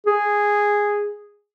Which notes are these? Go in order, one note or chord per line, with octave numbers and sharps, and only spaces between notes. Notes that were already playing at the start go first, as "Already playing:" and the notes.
G#4